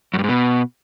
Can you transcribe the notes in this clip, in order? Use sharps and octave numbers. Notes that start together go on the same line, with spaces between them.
F#2
G2
G#2
B2